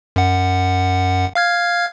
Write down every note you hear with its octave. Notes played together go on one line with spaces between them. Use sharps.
F#2 F#5
F5 F6 G#6